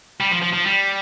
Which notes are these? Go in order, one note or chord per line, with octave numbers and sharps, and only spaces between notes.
G3
F3
F3
F3
G3